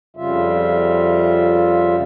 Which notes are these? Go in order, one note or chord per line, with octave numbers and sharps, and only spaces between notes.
F2 C#3 G3 F4 E5